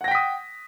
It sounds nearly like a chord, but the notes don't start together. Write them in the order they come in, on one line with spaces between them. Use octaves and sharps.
F#5 A#6 G5 B6 D#6